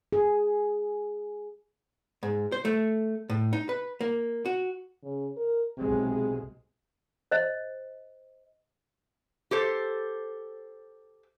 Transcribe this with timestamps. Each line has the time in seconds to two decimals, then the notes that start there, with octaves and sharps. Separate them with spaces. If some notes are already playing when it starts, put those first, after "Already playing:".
0.13 G#4
2.23 G#2
2.52 C5
2.65 A3
3.30 A2
3.53 D#4
3.69 B4
4.01 A#3
4.46 F#4
5.03 C#3
5.37 A#4
5.78 B1 C3 G#3
7.31 C5 D#5
9.51 G4 A4 C5